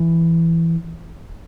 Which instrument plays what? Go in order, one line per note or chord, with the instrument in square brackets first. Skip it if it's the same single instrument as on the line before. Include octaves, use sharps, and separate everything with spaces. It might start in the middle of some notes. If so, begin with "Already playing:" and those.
Already playing: [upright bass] E3